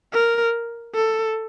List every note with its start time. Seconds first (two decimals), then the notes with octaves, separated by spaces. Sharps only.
0.13 A#4
0.95 A4